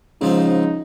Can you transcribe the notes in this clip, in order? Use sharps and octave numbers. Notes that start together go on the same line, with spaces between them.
G#2 C#3 F3 C4 D#4